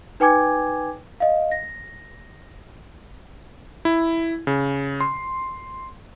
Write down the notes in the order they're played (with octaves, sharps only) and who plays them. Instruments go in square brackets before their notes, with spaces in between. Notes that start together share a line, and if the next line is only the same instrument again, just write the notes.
[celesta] D#4 B4 G5 G#5 D6 G#6
D#5 F5
A#6
[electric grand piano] E4
C#3
C6